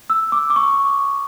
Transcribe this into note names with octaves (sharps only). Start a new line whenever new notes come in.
E6
D6
D6
C#6